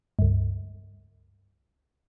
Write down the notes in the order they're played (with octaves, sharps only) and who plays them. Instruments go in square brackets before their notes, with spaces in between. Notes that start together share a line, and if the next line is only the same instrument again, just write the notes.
[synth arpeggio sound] C#2 G2